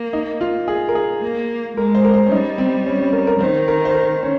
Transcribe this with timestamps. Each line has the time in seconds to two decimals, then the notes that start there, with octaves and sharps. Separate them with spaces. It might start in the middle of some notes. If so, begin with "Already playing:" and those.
Already playing: A#3
0.13 D#4
0.41 F4
0.68 G#4
0.89 A#4
0.95 G#4
1.22 A#3
1.77 G#3 A#4
1.95 C5
2.05 A#4
2.14 C5
2.26 C#4
2.32 G3 D#4
2.58 C4
2.86 C#4
2.99 C#4
3.13 A#4
3.27 A#4
3.40 D#3 C5
3.68 A#4
3.85 C5
3.94 A#4
4.23 C#4